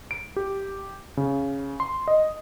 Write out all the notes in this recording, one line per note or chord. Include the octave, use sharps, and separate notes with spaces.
D7
G4
C#3
C6
D#5